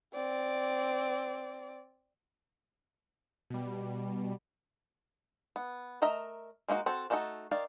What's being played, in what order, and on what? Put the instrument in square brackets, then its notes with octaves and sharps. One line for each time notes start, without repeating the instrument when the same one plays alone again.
[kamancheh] C4 D5
[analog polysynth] B2 G3
[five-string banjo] B3
A3 A#4 D#5 E5 A#5
G#3 A#3 D#4 F#4
C4 F#4 A4
A3 D4 D#4 F#4 A4
D#3 D5 F5